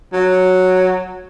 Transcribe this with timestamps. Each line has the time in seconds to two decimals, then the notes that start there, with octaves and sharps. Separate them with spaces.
0.13 F#3